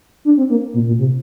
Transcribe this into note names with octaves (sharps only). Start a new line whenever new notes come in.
D4
C4
A#3
A#2
A#2
C3